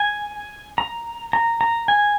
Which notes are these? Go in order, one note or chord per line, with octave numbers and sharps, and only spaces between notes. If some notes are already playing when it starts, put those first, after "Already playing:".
Already playing: G#5
A#5
A#5
A#5
G#5